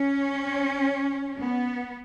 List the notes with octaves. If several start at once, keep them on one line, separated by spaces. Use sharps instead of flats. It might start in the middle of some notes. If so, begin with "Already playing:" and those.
Already playing: C#4
B3